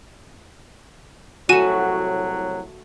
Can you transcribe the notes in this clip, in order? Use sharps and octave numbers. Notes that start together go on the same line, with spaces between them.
C2 A2 F#3 A3 F#4 G#5 D#7 E7